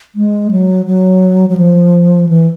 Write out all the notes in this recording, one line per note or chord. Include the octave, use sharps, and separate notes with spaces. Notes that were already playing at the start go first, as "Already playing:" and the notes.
G#3
F#3
F#3
F#3
F3
E3